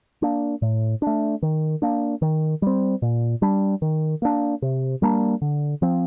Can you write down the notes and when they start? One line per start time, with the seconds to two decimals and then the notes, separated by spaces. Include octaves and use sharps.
0.22 A#3 D4
0.62 A2
1.02 A3 D4
1.42 D#3
1.82 A#3 D4
2.22 D#3
2.62 G3 C4
3.02 A#2
3.42 G3 D4
3.82 D#3
4.22 A#3 D4
4.62 C3
5.02 G3 A#3 D4
5.42 D3
5.82 F3 C4